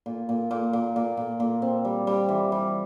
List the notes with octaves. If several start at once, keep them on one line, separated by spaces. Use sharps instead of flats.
A#2
A#2
A#2
A#2
A#2
A#2
A#2
C4
G3
G3
E3
G3